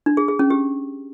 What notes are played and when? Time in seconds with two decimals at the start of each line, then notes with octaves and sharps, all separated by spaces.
0.06 D4
0.17 G#4
0.28 G#4
0.39 C#4
0.50 G4